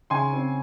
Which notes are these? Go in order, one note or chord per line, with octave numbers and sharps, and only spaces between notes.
C#3 G#5 C6
C4